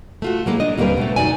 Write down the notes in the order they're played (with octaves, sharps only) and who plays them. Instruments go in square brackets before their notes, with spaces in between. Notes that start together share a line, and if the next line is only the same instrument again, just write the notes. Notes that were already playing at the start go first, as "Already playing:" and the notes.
[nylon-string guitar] A3 F4 F#4
F#3 G#3 A#3 E4
D4 D#5
D2 G3 A#3 C4 A#4 B4
B2 A3
F#2 D#4 F#4 D5 G#5